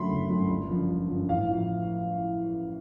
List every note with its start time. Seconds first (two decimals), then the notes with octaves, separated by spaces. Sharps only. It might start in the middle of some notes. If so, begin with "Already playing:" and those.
Already playing: F#2 D3 F#3 A3 B5 C6
0.09 F#1
0.29 F#2 D3 F#3 A3
0.49 G1
0.69 F#2 D3 F3
0.89 G1
1.09 F#2 D3 F3
1.29 A1 F5
1.49 A2 F3